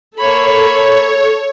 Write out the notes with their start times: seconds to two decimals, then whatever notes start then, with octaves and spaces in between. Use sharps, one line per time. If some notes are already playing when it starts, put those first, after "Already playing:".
0.18 A#3 A4 C#5 B5